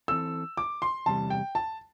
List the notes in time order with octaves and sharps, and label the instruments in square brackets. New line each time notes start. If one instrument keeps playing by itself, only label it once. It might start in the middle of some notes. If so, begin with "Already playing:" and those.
[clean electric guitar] E3 C4 A4 [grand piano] E6
[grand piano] D6
C6
[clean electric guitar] E2 C3 G3 [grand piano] A5
[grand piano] G5
A5